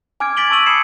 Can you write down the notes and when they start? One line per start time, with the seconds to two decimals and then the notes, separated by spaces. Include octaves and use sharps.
0.20 G#5 D6 F6 G#6 D7
0.37 G#6 A6 B6 D7 F#7 G7
0.50 A5 C#6 E6 D#7 F#7
0.66 B5 D#6 G#6 C7 C#7 E7